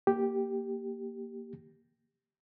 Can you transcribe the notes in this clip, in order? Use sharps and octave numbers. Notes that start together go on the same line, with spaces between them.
A#3 G4